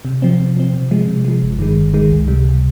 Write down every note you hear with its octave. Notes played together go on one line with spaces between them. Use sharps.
C3
F3 C4
C3
F3 C4
C3
F3 G#3
C3
F3 G#3
G1
G2 D#3 G#3
G1
G2 D#3 G#3
C#2
C3 G3
C#2